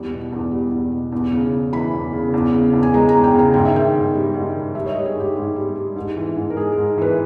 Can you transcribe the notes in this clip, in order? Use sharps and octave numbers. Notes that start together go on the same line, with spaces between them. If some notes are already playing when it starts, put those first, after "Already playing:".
Already playing: E2 G3
B2
E2
G3
E2
B2
E2
C#3
E2
E3 B5
E2
C#3
E2
C#3
E2
G#5
G#3 A#5
A#5
E2
G5
C#3
A#5
G#2 G5
E5
D#3 G5
G#2
G3
G#2
D#3
G3 E5
C#5
D#5
G3
G#4
G#2 G4
G#2
G3
G3
G#2
E3
G#2
A#4
G#3 G#4
G#2 A#4
E3 B4